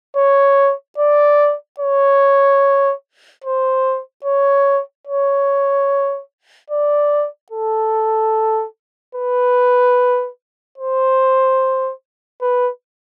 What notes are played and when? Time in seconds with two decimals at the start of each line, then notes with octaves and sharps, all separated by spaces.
0.16 C#5
0.98 D5
1.80 C#5
3.44 C5
4.24 C#5
5.07 C#5
6.70 D5
7.51 A4
9.15 B4
10.78 C5
12.42 B4